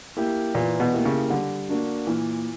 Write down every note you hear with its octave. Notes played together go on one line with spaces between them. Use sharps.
A#3 E4 G4
A#2 E3
B2
A#3 E4 G4
C#3
D3 G3
A#3 D4 F#4
A#2 E3